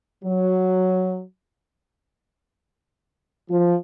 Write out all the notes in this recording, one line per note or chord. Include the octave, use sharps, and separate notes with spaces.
F#3
F3